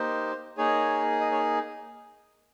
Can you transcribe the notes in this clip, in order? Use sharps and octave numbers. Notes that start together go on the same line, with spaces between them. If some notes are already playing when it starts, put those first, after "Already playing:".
Already playing: A#3 D#4 G4 C5
A#3 D#4 G#4 C#5
D#5
C#5